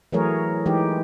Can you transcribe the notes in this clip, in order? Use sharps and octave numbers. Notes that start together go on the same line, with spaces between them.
E3 F#3 A3 G#4 A#4 C#5
E3 G#3 D#4 G4